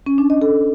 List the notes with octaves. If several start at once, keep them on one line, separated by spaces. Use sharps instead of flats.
C#4
D4
D#5
A4